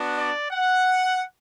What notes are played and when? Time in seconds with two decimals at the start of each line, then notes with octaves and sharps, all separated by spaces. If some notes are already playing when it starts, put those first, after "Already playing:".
Already playing: B3 D4 F#4
0.17 D5
0.51 F#5